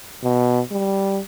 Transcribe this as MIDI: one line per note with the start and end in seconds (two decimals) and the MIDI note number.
0.23 0.60 47
0.71 1.20 55